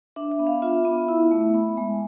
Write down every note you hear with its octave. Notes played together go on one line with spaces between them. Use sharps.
D4 E5
E5
B3
F5
F4 E5
B3
E4
A3
B3
G#3